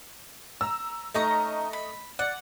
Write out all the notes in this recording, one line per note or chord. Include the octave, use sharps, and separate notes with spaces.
A#5 E6
A3 C#4 D#4 D#5 A#5 C#6
B5
D5 F#5